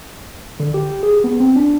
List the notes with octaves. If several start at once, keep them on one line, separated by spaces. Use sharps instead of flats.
D3
G4
G#4
B3
C4
D4